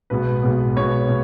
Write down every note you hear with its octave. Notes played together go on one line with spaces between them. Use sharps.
B1 B2 G#3 B3 B4
B1 B2 G#3 B3
B1 B2 G#3 B3 C#5
B2